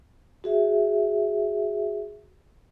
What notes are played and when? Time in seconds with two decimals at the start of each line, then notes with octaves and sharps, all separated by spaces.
0.44 F#4 G#4 E5